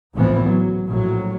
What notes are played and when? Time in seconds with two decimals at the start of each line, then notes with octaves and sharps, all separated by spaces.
0.15 G#1 C#2 A2 E3 F3 B3
0.45 F#3
0.87 A#1 A2 F#3